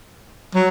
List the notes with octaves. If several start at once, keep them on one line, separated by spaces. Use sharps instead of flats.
F#3